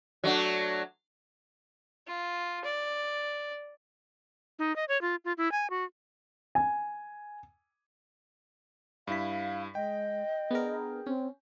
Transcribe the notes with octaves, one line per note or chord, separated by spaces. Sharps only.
F#3 A3 D4
F4
D5
D#4
D#5
C#5
F4
F4
E4
G#5
F#4
G#5
G2 E4 F5 B6
G#3 D#5 G5
B3 D4 G#4 A#4
C4 C#4